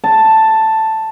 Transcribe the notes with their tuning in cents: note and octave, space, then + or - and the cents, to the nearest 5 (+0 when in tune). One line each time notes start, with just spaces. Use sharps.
A5 +5